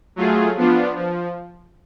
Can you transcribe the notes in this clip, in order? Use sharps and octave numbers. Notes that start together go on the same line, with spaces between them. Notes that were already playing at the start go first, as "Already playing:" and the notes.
F#3 A3 F4 G#4
F3 B3 D4 F4
F3